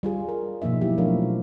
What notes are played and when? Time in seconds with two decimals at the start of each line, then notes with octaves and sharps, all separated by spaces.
0.03 G3 F4 G#4
0.29 A#4
0.62 B2 F3 A#3 D#4 E5
0.81 F3 F#3 E4 G4
0.98 F3 A3 D4 A#4 C#5 F5
1.22 B2